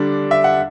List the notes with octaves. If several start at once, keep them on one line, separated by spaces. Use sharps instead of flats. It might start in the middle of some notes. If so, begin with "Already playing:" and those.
Already playing: D3 G3 D4
E5
F#5